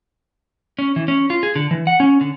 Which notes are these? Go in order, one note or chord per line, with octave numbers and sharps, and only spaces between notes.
C#4
E3
C#4
F4
G#4
D3
E3
F#5
C#4
D3